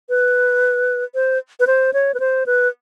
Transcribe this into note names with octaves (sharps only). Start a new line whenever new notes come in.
B4
C5
B4
C5
C#5
B4
C5
B4